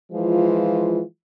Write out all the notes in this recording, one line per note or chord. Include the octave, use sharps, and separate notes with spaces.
E3 F3 G#3 F4